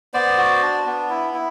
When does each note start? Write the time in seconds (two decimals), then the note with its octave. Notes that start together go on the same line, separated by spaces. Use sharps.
0.14 B3 C5 D5
0.37 F#4
0.62 D4
0.86 B3
1.10 E4
1.34 E4